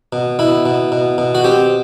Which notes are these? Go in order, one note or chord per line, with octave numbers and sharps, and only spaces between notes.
B2
B2 E4
B2
B2
B2
F#4
C4 G4